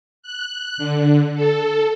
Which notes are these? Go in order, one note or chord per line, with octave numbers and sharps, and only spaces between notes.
F#6
D3
A4